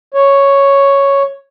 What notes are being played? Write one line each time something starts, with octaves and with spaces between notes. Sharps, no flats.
C#5